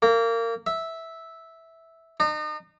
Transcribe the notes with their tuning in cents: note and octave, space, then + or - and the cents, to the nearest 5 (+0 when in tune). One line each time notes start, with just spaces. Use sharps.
A#3 -25
E5 -10
D#4 -40